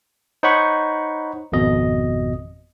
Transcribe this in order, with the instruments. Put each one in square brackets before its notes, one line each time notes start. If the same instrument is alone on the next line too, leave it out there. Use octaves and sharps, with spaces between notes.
[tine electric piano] D#4 C5 C#5 F#5 B5 C#6
G#1 F2 B2 D#5